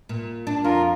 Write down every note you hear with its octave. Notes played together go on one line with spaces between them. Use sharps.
A#2
D4
F2 F4 A#4